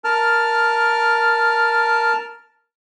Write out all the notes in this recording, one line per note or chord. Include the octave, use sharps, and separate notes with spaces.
A#4 A5 F6